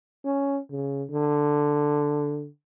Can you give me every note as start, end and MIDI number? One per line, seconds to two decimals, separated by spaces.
0.25 0.60 61
0.71 1.03 49
1.11 2.47 50